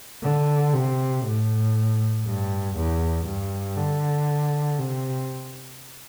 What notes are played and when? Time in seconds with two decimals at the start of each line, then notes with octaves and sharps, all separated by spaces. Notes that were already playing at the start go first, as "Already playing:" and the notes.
0.23 D3
0.73 C3
1.25 A2
2.25 G2
2.75 E2
3.26 G2
3.77 D3
4.78 C3